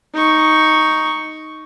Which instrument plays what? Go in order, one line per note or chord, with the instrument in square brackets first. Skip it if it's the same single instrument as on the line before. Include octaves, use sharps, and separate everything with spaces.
[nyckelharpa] D#4 C#6